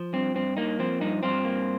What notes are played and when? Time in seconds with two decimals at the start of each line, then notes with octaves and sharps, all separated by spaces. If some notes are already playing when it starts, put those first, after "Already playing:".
Already playing: F3
0.13 G2 C4
0.35 G2 C4
0.57 A#3 D#4
0.79 F3 C4
1.01 G2 D#4
1.23 G2 C4 F4
1.45 A#3